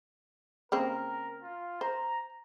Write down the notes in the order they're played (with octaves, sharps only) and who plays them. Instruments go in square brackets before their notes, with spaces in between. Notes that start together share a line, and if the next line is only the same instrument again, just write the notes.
[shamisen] C#3 A#3 C4 [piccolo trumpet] A#4
[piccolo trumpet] F4
[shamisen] C5 [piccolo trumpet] A#5